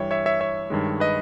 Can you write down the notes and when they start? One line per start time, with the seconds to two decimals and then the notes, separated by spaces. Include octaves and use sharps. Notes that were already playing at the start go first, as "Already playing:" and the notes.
Already playing: G2 E3 G3 C#5 E5 G5
0.11 C#5 E5
0.26 C#5 E5
0.41 C#5 E5
0.70 G2 D#3 G#3
1.00 B4 D#5